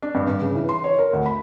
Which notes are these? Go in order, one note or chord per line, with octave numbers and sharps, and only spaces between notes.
D4
G2
G2
C#3
E3
C6
C#5
A#4
D2
B5